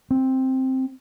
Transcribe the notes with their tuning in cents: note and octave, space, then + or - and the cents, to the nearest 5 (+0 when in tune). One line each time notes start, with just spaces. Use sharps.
C4 +5